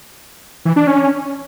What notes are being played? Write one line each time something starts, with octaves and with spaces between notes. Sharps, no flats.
E3
D4
C#4